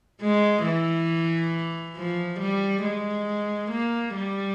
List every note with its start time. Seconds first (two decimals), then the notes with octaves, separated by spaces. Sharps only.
0.22 G#3
0.66 E3
1.96 F3
2.40 G3
2.83 G#3
3.71 A#3
4.15 G3